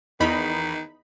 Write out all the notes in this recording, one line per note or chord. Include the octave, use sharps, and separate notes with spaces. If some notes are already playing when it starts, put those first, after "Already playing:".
E2 D#3 D#4 B5